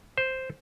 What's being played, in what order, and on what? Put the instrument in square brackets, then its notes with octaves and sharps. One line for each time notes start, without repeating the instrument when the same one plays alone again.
[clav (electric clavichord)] C5